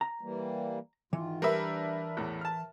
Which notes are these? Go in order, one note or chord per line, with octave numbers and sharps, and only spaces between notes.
A#5
E3 G3 A#3
G#2 D#3 E3 F4
G3 D4 A#4 B4 E5
E2 A2
A5 F6